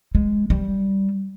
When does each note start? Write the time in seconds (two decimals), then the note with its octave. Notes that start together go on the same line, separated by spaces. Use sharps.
0.15 G#3
0.50 G3